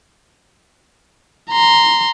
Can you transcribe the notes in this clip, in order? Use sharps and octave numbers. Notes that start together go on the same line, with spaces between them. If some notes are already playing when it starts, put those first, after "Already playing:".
A#5 C6